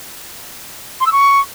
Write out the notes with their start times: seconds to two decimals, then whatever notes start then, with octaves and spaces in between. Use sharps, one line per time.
1.00 C6
1.06 E6
1.12 C#6